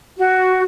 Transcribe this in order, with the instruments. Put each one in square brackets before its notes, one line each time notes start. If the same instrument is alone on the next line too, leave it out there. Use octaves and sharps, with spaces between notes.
[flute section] F#4